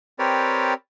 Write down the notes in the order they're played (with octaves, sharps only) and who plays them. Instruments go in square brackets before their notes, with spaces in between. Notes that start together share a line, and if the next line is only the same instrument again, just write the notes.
[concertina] C4 G4 A#4 B4 C#5 D5